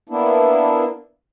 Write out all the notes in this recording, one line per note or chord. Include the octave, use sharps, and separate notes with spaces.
A#3 B3 D4 E4